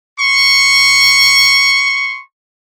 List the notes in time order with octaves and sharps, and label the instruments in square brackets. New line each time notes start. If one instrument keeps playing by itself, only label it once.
[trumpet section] C6 C#6